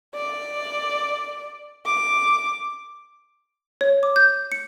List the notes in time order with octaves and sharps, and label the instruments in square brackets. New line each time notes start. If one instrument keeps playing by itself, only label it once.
[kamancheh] D5
D6
[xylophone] C#5
D6
G6
C#7